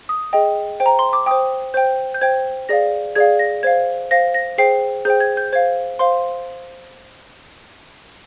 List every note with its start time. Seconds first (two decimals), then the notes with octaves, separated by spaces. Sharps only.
0.09 D#6
0.33 G#4 D#5 G5
0.80 C5 G5
0.86 A#5
0.99 C6
1.13 D6
1.26 C5 G5 D#6
1.74 C5 G5 G6
2.14 G6
2.21 C5 G5 G#6
2.69 G#4 D5 F5 A#6
3.15 G#4 D5 F5 G#6
3.39 A#6
3.63 C5 F5 G#6
4.11 C5 F5 A#6
4.34 A#6
4.58 G#4 C5 G5 C7
5.05 G#4 C5 G5 G6
5.20 G#6
5.37 G6
5.53 C5 F5 G#6
5.99 C5 F5 C6